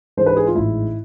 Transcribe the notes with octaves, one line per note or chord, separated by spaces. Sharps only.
G#2 E3 G#3 D4 C5
B4
G#4
F4
A1 G#2 G#3 E4